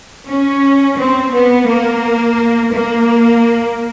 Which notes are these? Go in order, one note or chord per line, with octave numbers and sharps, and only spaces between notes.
C#4
C4
B3
A#3
A#3